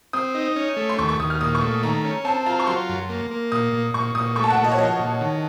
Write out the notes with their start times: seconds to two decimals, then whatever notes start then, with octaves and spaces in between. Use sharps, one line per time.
0.13 C4 D#6
0.35 D#4
0.56 C#4
0.77 A3
0.89 C6
0.99 D#2 C#6
1.09 C#6
1.19 D#2 D#6
1.30 F6
1.41 A#2 D#6
1.55 C#6
1.61 A3
1.83 D#3 A#5
2.04 C#4
2.25 C4 A5
2.46 F4 A#5
2.60 C#6
2.67 F#3 C6
2.89 F#2
3.09 A#3
3.31 A#3
3.52 A#2 D#6
3.73 A#2
3.94 A#2 C#6
4.15 A#2 D#6
4.36 A3 C#6
4.44 A5
4.50 F#5
4.57 A#2
4.64 D#5
4.72 C#5
4.78 F3 D#5
4.99 A#2
5.21 D#3